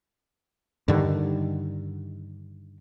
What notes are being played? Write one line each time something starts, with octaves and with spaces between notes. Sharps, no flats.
G2 D3 D#3